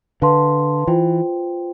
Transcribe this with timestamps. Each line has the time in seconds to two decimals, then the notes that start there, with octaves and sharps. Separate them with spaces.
0.21 D3 B4 F5 A5 C6
0.87 E3 F4 C5 G5